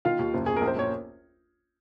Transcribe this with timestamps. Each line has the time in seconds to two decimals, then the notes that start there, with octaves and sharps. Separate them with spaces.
0.05 D#3 F4 F5
0.19 D#2
0.34 F#1
0.46 F#1 G#4
0.56 A#4
0.61 A#1
0.68 C5
0.76 A#1 C#5